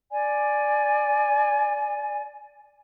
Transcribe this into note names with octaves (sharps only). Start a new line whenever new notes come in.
D5 G#5